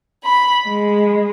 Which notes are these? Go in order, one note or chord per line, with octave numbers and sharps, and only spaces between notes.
B5
G#3